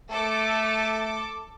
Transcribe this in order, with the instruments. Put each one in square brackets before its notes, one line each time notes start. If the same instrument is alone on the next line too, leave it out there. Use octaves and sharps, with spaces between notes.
[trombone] A3 [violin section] A4 D6